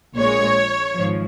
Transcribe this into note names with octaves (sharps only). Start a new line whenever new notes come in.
A#1 A#2 G#3 C#5
G#1 G#2 F3